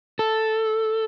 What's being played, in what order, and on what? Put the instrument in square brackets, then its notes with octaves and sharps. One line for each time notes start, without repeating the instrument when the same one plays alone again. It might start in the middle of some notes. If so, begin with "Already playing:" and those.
[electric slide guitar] A4